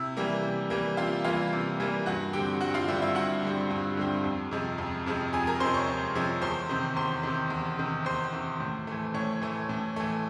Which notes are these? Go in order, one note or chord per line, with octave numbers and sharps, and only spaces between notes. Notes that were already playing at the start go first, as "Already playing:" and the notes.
Already playing: C3 E4 E5
E3 G3 A#3
C3
E3 G3 A#3
C3 F4 F5
E3 G3 A#3 F4 F5
C3
E3 G3 A#3
G2 F#4 F#5
D3 G3 C4 G4 G5
G2 F#4 F#5
F4 F5
D3 G3 C4 E4 E5
E4 E5
G2 F#4 F#5
D3 G3 C4
G2
D3 G3 C4
F2
C3 F3 G#3
F2
C3 F3 G#3
F2 G#4 G#5
A#4 A#5
C3 F3 G#3 C5 C6
C#5 C#6
F2
C3 F3 G#3
E2 C5 C6
C3 D#3
E2 C5 C6
C3 D#3
E2
C3 D#3
E2 C5 C6
C3 D#3
A2
E3 A3
A2 C#5 C#6
E3 A3
A2
E3 A3